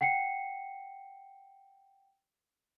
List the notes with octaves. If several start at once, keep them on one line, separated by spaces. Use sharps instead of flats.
F#5 G5 C7 C#7